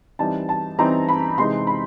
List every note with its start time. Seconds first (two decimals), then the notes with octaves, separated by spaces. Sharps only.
0.19 E3 G3 C4 D#4 A5
0.49 A5
0.78 E3 G3 C4 D#4 A#5
1.09 B5
1.38 C3 E3 G#3 C4 D#4 C6
1.67 B5